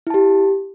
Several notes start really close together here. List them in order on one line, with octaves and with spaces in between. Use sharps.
E4 A5 G4